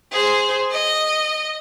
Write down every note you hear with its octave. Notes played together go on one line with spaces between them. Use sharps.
G#4 C5
D#5